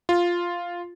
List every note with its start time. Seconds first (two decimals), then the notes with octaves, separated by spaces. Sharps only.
0.09 F4